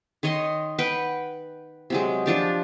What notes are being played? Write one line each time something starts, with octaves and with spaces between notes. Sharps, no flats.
D#3 C#5 D#5 C6
B4 F#5 G5
C3 F#3 G#3
F3 D4 G4